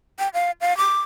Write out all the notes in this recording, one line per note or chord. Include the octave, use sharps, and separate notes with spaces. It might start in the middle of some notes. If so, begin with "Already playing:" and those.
G5
F5
F5
D6